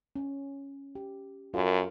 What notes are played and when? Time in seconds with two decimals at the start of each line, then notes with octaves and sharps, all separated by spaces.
0.16 C#4
0.95 G4
1.54 F#2 F4 A4 A#4